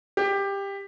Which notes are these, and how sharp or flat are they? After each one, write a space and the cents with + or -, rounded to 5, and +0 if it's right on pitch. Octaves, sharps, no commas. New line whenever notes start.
G4 +15